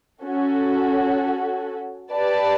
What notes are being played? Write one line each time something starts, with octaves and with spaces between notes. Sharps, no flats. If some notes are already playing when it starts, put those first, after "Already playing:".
C#4 F#4 A4
G4 B4 D5 A5